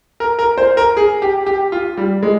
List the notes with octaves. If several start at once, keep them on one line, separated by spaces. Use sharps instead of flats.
A#4
A#4
C5
A#4
G#4
G4
G4
F4
G3
G#3